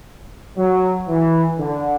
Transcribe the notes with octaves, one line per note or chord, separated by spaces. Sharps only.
F#3
E3
D3